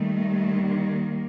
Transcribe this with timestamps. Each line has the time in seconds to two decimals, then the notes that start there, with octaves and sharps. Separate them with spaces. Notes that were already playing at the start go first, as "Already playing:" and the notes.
Already playing: D#2 D#3 G3 A3
0.67 A#3